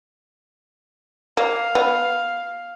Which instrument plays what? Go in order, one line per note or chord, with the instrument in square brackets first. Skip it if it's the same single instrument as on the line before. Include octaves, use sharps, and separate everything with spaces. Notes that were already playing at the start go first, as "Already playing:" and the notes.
[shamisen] A#3 [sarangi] F5
[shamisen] B3